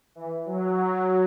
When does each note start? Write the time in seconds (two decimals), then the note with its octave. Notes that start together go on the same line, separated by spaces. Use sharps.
0.15 E3
0.46 F#3